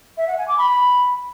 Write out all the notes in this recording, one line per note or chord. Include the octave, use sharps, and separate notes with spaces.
E5
F#5
G#5
D6
B5